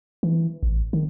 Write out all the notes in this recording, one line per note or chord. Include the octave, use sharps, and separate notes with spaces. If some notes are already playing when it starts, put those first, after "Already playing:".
E3
A1
D#3